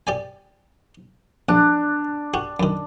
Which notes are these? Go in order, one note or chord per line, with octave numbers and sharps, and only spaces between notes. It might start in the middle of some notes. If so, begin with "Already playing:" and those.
G4 D5 G#5
A#1 D4
F#4 G4
F#2 D#3